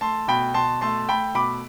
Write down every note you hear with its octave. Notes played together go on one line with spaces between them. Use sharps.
A3 A5 C6
B2 G5 B5
B2 A5 C6
A3 A5 C6
A3 G5 B5
B2 B5 D6